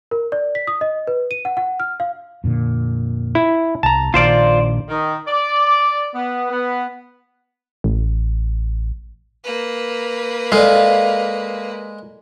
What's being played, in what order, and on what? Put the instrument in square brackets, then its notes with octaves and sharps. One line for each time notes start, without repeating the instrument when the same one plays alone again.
[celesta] A#4
D5
B6
D#6
D#5
B4
D#7
F#5
F#5
F6
F5
[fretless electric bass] F2 A#2 D3
[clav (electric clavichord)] E4
[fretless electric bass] C2 [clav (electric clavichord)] A5 A#5
[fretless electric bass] A#1 D#3 [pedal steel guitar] F4 C5 D5
[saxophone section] D#3
D5
B3
B3
[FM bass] A1
[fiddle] A#3 B4
[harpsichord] G#3 [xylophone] A4 D5 [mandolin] F5